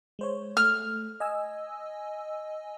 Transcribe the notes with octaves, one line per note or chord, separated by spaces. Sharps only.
G#3 C5 C#5
A3 F6
D#5 G#5 E6